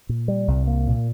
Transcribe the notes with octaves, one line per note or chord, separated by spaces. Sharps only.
A#2
G3
C2
A#3
A#2